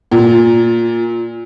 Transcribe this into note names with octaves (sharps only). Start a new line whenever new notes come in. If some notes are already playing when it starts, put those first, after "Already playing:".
A#2